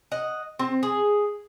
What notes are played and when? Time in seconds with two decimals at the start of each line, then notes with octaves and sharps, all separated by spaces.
0.12 D#5 F#5
0.59 C4
0.83 G#4